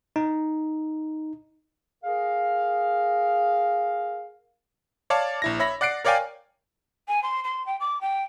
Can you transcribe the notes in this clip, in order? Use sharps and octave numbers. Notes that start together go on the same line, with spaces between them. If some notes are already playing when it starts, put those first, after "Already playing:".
D#4
G#4 A#4 F5
C#5 D5 F5 A5
A#1 E4 A#6
C#5 E5 B5 A#6
D5 F#5 F#6 C7 D7
A#4 C#5 D5 F5 G5 G#5
G#5
C6
C6
G5
D6
G5